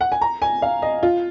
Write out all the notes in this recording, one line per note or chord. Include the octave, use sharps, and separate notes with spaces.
F#5
G#5
A#5
G#5
F5
D#5
F4